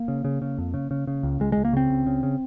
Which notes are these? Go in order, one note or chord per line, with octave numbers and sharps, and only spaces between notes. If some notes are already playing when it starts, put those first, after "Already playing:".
Already playing: A#3
C#3
C#3
C#3
F2
C#3
C#3
C#3
C#2
C#2 G#3
C#2 G#3
A#3
C#3 C4
C#2
C#3
C#3